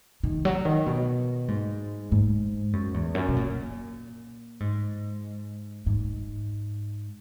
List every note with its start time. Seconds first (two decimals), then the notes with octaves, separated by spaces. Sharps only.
0.23 D#3
0.45 F#3
0.65 D#3
0.86 B2
1.48 G#2
2.12 G#2
2.73 F#2
2.94 E2
3.15 F#2
3.28 B2
3.36 A#2
4.60 G#2
5.86 G#2